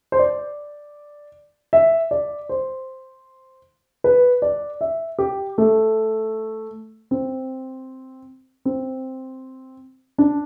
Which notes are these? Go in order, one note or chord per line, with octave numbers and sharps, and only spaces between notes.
C5
D5
E5
D5
C5
B4
D5
E5
G4
A3
C4
C4
D4